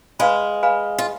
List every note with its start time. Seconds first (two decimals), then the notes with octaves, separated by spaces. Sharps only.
0.19 G#3 B4 F5 G#5 B5
0.63 B4 F5 G#5 B5
0.98 F4